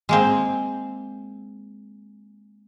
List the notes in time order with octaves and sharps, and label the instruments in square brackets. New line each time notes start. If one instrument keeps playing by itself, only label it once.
[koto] G#3 A#3 C4